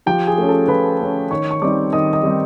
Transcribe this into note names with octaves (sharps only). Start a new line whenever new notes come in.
F3 G4 G5
G#4 G#5
A3 C#4
A4 A5
F3 B4 B5
A3 C#4
D#3 C#5 C#6
C#6
G3 C4 D#4 D5 D6
D#3 D#5 D#6
D#5 D#6
G3 C4 D#4